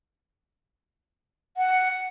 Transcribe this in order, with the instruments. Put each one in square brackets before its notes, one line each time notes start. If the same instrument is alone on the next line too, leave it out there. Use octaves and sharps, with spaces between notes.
[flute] F#5